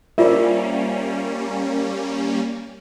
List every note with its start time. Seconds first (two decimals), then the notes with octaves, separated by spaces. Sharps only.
0.18 G3 A#3 C#4 F4 A#4 C5 D5 E5